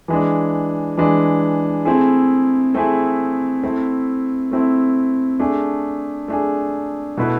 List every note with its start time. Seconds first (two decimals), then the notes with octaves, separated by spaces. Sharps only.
0.08 E3 G#3 D4
0.98 E3 G#3 D4
1.85 A3 C4 E4 G#4
2.74 A3 C4 E4 G#4
3.63 A3 C4 E4
4.51 A3 C4 E4
5.39 A3 D4 G#4
6.28 A3 D4 G#4
7.17 B2 A3 E4 B4